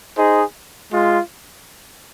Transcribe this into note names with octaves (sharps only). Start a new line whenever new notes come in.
D#4 G#4 C5 D#5
G#3 F4